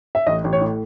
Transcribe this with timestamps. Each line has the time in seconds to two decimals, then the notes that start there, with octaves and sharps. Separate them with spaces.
0.15 E5
0.27 A1 D#5
0.44 A1
0.53 C#5
0.61 A2